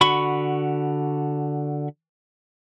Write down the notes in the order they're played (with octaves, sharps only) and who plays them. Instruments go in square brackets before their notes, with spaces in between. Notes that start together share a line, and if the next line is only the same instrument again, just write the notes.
[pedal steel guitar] D3 F#4 B5 C#6